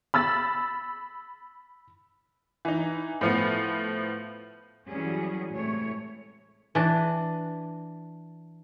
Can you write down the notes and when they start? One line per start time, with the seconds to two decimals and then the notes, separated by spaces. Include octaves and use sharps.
0.14 B5 E6 A6
2.65 E3 D#4
3.21 A2 F3 B3
4.88 E3 F#3 G3 C#4 G#4
5.52 A2 C3 G#3 A3 C#5
6.75 E3 D4